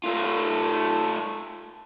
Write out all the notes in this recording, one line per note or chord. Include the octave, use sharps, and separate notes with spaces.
A3 F4